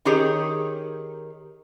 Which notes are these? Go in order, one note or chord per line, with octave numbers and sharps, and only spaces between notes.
D#3 D#4 G4 G#4 C#5